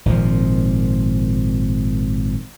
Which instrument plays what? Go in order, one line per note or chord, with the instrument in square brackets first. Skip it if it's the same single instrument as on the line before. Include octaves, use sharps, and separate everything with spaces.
[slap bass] G#1 A#2 D#3 F3